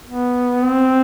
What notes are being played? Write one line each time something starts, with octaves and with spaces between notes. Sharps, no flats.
B3
C4